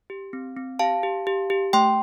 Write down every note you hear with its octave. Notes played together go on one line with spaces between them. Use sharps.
G4
C4
C4
G4 F5 A5
G4
G4
G4
A3 G5 C6